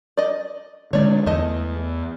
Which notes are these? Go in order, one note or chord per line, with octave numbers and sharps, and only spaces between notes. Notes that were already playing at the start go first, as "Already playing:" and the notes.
D5 D#5
D3 G#3 C#5 D5
E2 A3 D#5